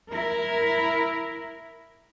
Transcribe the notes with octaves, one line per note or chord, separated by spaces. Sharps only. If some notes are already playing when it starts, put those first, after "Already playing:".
E4 A#4